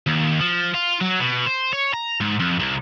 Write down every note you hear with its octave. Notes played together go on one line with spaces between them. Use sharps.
D#2
F3
F4
F#3
B2
C5
C#5
A#5
G#2
F2
C2